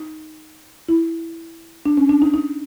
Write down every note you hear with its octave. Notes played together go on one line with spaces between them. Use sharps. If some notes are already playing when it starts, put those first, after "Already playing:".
Already playing: D#4
E4
D4
C#4
D4
D#4
D#4